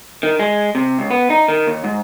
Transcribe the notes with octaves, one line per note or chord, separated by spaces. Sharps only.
D#3
G#3
C3
C#2
B3
D#4
D#3
D#2
G#2